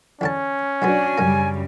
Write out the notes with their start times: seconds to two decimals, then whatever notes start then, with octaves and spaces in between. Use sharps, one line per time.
0.21 E2 D3 C#4 A5
0.82 B1 G#2 B3 D4 F#4 G#5
1.18 B1 F#2 C#3 G3 A#3